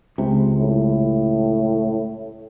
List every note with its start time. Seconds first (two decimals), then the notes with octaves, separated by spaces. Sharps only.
0.18 C#2 C3
0.59 A2